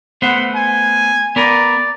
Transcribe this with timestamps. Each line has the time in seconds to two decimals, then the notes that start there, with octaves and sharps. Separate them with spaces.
0.22 A3 B3 C5 F#5
0.55 G#5
1.36 B3 A#4 D5